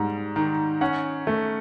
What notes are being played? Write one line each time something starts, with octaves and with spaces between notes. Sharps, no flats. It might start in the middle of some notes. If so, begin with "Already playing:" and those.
Already playing: G#2 G3
D#3
C#4 F#5
A3